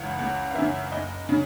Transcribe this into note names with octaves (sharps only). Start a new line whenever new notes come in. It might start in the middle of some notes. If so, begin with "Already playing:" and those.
Already playing: C#2 C#3 E3 F5 F#5
C#2 F#5
F5
C#3 E3 E5
F#1 D#5
C#3